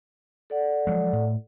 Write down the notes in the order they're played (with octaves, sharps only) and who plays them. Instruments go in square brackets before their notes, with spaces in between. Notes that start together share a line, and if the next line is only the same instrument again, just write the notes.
[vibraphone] A4 D5 F#5
[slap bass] F3 F#3 G#3
A2